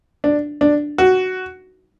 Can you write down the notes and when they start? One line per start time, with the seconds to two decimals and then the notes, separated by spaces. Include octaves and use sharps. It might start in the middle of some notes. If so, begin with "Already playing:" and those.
0.24 D4
0.61 D4
0.98 F#4